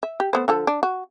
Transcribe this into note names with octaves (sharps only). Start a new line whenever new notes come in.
E5
G4
A3 B3 C5
D3 F3 A4
D4
F#4